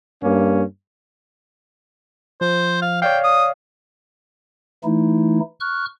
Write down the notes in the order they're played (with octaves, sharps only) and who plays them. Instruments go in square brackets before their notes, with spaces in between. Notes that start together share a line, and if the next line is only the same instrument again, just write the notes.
[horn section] G2 A#3 C#4
[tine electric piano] F3 [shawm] C5
[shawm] F5
[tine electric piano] C#5 D5 F5 [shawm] G5
[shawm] D#6
[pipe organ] E3 A3 D#4 E4
C#6 F6 F#6